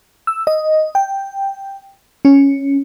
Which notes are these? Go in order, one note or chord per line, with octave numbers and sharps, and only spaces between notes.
E6
D#5
G5
C#4